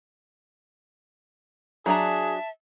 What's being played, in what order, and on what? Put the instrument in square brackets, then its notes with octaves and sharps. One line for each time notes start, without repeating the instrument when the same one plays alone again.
[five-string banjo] F#3 D4 A#5 [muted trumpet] G#4 [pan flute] E5 [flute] A5